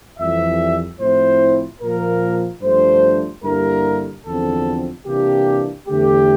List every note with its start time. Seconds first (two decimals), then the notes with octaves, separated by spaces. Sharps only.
0.20 F2 E3 G3 E5
1.00 A2 F3 C4 E4 C5
1.81 A#2 F3 A#3 A#4
2.62 G2 F3 A3 D4 C5
3.44 G2 D3 G3 A#3 E4 A#4
4.25 E2 D3 F3 C4 A4
5.06 C3 E3 A#3 D4 G4
5.88 E2 D3 A3 G4